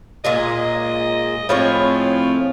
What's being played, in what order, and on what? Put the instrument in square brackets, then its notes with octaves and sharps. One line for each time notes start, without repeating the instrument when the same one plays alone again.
[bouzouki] A#2 G#3 G#4 [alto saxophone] D#5
[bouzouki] A2 G#4 C#5 [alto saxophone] F3 [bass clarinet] C4